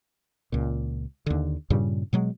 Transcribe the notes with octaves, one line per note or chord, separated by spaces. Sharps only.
C#2 A#2
D#2 D3
G2 A#2 C#3 G3
B2 F#3 G#3